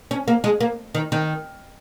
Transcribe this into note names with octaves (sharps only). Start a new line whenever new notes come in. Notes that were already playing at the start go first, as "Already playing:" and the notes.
C#4
A#3
G#3
A#3
D#3
D#3